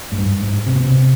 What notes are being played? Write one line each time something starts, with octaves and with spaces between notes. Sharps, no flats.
G#2
G2
G#2
C3
B2
C3